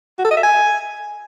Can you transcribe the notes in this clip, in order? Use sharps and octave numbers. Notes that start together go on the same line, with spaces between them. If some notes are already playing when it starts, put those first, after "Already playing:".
F#4
A4
D#5
E5
G#5